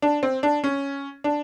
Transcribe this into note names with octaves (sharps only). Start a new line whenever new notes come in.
D4
C4
D4
C#4
D4